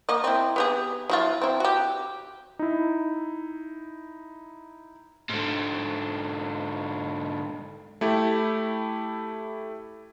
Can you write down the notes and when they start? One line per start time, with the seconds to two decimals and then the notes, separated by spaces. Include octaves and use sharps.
0.09 A#3 D#5
0.24 C4 E4
0.56 B3 G4 G#4
1.10 F#3 E4 F4
1.42 C4 E4
1.60 F#4 G4
2.59 D#4 E4
5.29 G#2 D3
8.01 A3 E4 G4